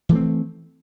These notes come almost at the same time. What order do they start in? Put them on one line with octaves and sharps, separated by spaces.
E3 A3 C4